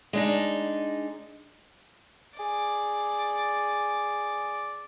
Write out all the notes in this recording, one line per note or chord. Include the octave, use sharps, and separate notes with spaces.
G#3 D4 D#4
G#4 D5